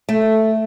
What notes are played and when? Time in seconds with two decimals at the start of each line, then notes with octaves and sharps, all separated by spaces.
0.09 A3